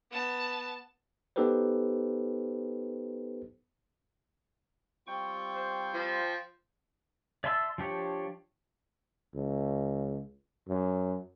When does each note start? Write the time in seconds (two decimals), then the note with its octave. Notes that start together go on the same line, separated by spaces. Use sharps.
0.11 B3 A5
1.36 B3 D#4 G4 A4 B4 C5
5.07 G3 C4 F4 G5 C#6
5.55 C5
5.95 F3
7.44 D5 E5 A5 C6 E6
7.78 F3 D4 G4 C#5
9.35 C#2
10.69 F#2